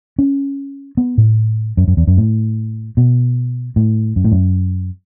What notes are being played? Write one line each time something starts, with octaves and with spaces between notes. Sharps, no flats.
C#4
B3
A2
F#2
F#2
E2
F#2
A2
B2
A2
F#2
A2
F#2